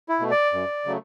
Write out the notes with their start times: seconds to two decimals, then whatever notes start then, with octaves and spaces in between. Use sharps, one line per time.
0.09 E4
0.20 B2 A3
0.31 D5
0.53 F#2
0.85 C#3 F#3 A3